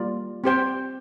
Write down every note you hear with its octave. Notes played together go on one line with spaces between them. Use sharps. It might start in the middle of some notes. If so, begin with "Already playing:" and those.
Already playing: G3 A#3 F4 D5
C4 G4 C5 G5